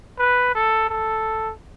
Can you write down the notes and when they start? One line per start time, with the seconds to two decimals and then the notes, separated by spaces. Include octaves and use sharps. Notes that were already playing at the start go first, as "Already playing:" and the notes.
0.19 B4
0.54 A4
0.89 A4